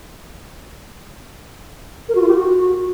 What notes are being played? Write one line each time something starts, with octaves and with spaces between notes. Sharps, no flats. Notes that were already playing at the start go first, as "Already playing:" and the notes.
A#4
F#4
F4
G4
F#4